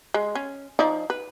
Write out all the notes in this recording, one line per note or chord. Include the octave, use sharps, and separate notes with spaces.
G#3
C#4
F3 D#4 D5
B4